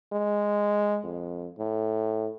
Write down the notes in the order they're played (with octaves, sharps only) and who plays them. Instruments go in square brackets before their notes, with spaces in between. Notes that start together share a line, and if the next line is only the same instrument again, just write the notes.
[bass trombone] G#3
F2
A2